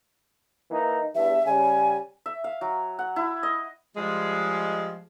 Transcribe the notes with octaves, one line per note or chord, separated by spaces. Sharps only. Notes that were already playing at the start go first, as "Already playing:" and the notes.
E3 A#3 D#4
E2 G2 E5
C#3 G3 G#5
E5
F5
F#3
F#5
E4
D#5
F3 G3 G#3